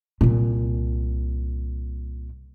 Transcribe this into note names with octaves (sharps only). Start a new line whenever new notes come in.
C2 A#2